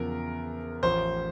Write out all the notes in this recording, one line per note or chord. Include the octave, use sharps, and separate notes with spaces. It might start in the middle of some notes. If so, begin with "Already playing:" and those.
Already playing: E2 C#3 F3 A#4
A1 A2 F3 C5